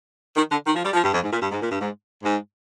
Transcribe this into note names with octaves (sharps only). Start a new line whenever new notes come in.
D#3
D3
D#3
F3
G3
F3
G2
F2
G#2
A#2
G2
G#2
A#2
G2
G#2
G#2